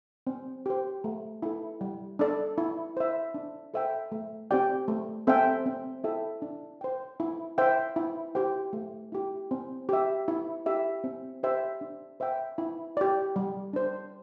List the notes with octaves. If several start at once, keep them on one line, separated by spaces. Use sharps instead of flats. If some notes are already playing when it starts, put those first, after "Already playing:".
C4
G4 C5
A3
E4 A4
G3
D4 A4 D5
E4
C5 E5
D4
A4 C5 E5 G5
A3
C4 G4 D5 G5
A3
C4 A4 E5 G5
C4
E4 A4 E5 G5
D4
C5 G5
E4
C5 E5 G5
E4
G4 C5 G5
A3
E4 G4
C4
G4 E5
E4
G4 E5
C4
G4 C5 E5 G5
D4
C5 E5 G5
E4
G4 D5
G3
D4 C5